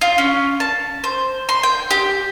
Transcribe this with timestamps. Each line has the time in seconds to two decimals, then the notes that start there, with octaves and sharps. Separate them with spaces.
0.01 F4
0.18 C#4
0.60 A5
1.04 C5
1.49 C6
1.63 G5
1.91 G4